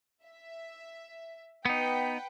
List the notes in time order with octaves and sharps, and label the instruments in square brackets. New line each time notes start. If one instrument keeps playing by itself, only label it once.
[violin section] E5
[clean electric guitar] B3 D#4 [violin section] B4 F#5 G5